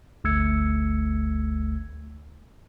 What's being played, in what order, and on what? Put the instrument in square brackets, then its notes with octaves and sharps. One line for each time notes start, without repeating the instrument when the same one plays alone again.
[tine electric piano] G1 D2 A3 E6 G#6 C#7